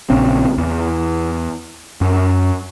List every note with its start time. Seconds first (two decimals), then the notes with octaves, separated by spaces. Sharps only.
0.10 A#1 C#3 C4
0.58 E2
2.01 F#2